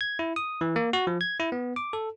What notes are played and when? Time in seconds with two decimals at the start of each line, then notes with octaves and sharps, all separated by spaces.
0.01 G#6
0.19 E4
0.36 D#6
0.61 E3
0.76 A#3
0.93 F#4
1.07 F3
1.21 G#6
1.40 E4
1.52 B3
1.76 D6
1.93 A4